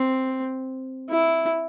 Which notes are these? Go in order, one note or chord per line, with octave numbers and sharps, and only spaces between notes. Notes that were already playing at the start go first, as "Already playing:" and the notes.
Already playing: C4
E4